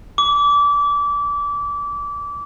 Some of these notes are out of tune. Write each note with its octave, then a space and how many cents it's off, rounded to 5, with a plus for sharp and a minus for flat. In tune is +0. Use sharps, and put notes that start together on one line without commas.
D6 -25